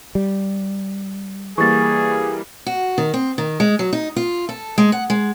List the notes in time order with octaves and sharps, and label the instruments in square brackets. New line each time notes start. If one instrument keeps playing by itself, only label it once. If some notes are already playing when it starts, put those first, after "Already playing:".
[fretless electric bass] G3
[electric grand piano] E3 G3 A#3 [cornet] G#4 [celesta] C#6 A6
[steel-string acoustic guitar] F#4
D#3
C4
D#3
G#3
F#3
D#4
F4
A4
G#3
F#5
G#3